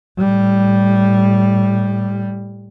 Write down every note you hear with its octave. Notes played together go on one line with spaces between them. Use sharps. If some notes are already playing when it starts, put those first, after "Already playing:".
A2 G3